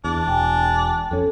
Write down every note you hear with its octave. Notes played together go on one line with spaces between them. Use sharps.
E2 D4
E1 G5 G#5
F2 C#4 A4